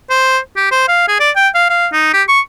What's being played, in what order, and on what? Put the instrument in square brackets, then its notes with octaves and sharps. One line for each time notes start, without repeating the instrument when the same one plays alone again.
[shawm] C5
G4
C5
F5
G#4
D5
G5
F5
F5
D#4
G4
C#6